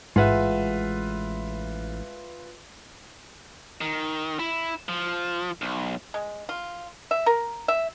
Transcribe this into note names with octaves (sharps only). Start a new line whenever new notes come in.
A1 G#2 G#3 F4 B4 E5 F#5
D#3
E4
F3
B1
G#3
F4
E5
A#4
E5